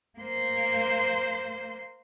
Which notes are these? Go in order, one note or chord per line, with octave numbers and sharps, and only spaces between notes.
A#3 C5